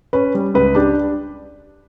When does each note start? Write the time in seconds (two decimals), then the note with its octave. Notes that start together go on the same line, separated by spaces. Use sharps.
0.13 C#4 B4
0.35 G3
0.54 C#2 B4
0.75 D4 G4